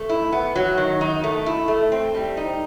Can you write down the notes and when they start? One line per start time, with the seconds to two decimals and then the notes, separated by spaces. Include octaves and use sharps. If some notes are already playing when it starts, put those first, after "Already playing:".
Already playing: A3
0.09 E4
0.32 B3
0.55 F#3
0.78 D#3
1.01 D#4
1.24 A3
1.46 E4
1.68 A3
1.92 C4
2.14 G3
2.37 D#4